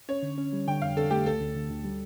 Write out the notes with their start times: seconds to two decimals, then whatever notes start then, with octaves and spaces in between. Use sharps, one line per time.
0.09 C#4 C#5
0.23 D3
0.38 C#4
0.53 G3
0.67 D3 G5
0.82 F2 F5
0.96 D3 A4
1.11 A3 G4
1.26 D2 A4
1.41 D2
1.56 D3
1.70 D2
1.85 G3